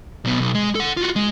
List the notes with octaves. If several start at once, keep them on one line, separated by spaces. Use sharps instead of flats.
B1 B2
B1
G#3
A4 F#5
F4 F#4
G#3